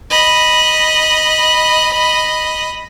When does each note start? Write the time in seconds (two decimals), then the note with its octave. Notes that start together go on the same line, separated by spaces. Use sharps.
0.10 D#5 B5